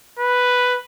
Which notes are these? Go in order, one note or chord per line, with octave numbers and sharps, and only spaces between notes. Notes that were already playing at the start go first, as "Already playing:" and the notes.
B4